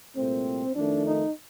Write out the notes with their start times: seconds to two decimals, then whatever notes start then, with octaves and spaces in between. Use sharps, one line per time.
0.15 C2 A#2 A3 C4
0.74 F2 D#3 A3 D4
1.05 D#4